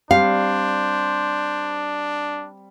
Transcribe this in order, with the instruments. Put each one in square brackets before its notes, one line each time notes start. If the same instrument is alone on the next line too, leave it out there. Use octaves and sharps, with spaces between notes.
[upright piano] G3 C4 [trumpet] D4 [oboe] C5 [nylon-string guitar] F5